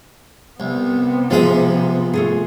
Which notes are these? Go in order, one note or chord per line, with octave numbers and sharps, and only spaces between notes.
C2 C3 B3
F3 G#3 F4 G#4 E5
A3 F4 G#4